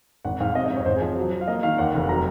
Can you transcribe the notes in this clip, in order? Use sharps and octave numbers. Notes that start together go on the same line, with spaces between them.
G#1 F#5
G#2 F5
C3 D#5
D#5
F2
C#5
G#1 C5
G#4
F3
F#3
F#3
F5
A#3 D#5
D#3 F5
D#2 F#5
F1
F#3 A#5